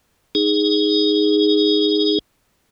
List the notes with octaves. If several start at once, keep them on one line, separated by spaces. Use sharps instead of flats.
D#4 G#4